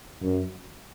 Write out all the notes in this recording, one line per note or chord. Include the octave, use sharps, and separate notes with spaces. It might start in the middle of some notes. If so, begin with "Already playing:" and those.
F#2